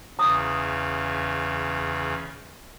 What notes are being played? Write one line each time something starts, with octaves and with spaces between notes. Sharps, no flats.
E2 C#3 A#5 D#6